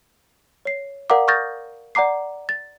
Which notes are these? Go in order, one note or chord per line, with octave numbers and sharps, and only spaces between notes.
C#5 C7
A#4 D5 F5 F#5 A#5 D6
C#6 D#6 F6 G6 A6 A#6
D5 F#5 A#5 D6 C7
A6